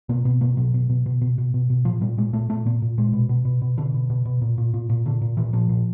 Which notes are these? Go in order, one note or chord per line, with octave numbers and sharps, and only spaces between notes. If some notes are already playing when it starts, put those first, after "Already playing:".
B2 A#3
B2 B3
B2 A#3
B2 F#3
B2
B2
B2
B2
B2
B2
B2
A#2 F3
A#2 G3
A#2 G#3
A#2 A3
A#2 A3
A#2 A#3
A#2
A#2 G#3
B2
B2
B2
B2
B2 D3
B2
B2
B2
A#2
A#2
A#2
A#2
A#2 D3
A#2
A#2 E3
A#2 F3
A#2